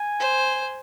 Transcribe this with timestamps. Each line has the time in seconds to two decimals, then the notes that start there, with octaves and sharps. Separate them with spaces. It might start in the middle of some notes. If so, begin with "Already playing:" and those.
Already playing: G#5
0.20 C5